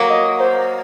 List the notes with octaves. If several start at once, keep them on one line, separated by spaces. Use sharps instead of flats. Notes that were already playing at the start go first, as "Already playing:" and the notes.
Already playing: F#3 A#3
D#5
C5